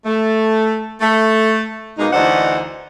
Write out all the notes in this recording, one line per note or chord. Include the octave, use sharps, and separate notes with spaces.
A3
A3
B2 G#3 A#3 D#4
D2 E3 D4 D#4 C5 F#5